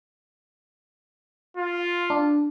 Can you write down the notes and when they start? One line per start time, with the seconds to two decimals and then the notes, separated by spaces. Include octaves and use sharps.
1.57 F4
2.10 D4